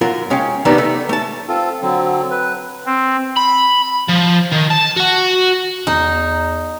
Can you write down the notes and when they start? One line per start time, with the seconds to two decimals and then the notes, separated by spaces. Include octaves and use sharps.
0.01 F#2 F4 A#4 F#5
0.30 G#3 C#4 F5 G5
0.65 C3 D#3 G3 B3 D4 D#4
0.78 A3
1.09 A3 A5
1.48 C4 F4 A4
1.82 D3 F#3 C4
2.31 B4
2.86 C4
3.36 B5
4.09 F3
4.52 D#3
4.71 A5
4.96 F#4 F#5
5.87 E2 D#4 A#5